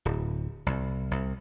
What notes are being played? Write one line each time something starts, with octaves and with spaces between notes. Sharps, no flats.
D1
C2
C2